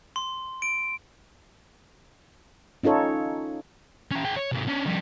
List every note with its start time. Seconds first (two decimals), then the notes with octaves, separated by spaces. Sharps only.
0.16 C6
0.62 D7
2.83 C#4 D#4 F4 A4 C#5
4.11 C#4 G4
4.25 G#4 G5
4.37 C#5
4.52 G#2 C3
4.68 C#4 D4
4.86 F2 G3